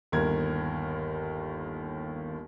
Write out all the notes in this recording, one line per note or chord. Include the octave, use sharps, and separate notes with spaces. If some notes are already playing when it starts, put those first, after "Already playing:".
G1 D#2 A#4 G#6